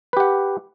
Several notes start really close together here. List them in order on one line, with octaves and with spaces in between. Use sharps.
B4 G4 F#5